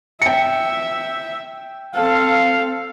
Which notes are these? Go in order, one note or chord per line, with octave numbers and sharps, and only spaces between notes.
E5 G5 C#7
C4 A4 F5